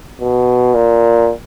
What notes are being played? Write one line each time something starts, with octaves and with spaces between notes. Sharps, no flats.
B2
A#2